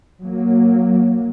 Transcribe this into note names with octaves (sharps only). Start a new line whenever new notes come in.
F#3 A#3